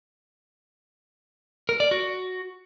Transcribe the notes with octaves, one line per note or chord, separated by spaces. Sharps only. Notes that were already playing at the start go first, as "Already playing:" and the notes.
A#4
D5
F#4